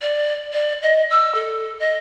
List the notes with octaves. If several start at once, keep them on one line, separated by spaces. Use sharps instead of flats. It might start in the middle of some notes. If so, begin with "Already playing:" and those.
D5
D5
D#5
E6
A4
D#5